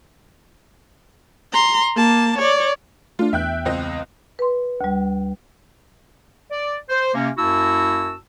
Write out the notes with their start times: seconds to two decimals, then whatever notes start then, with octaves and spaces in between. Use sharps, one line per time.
1.52 A#5 C6
1.96 A#3 A5
2.38 C#5 D5
3.19 A3 D4 F4
3.33 E2 E5 G5 F#6
3.65 C#2 C4 D#5
4.39 B4 C6
4.81 D2 G3
6.51 D5
6.89 C5
7.14 C3 A#3 C#4
7.37 F#2 A#3 E4 F#4 A5 E6